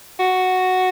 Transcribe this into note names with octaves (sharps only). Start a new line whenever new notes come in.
F#4